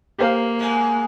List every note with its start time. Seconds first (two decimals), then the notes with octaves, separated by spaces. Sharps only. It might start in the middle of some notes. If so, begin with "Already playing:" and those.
0.19 A#3 G4 C5 F5
0.59 G#2 G#3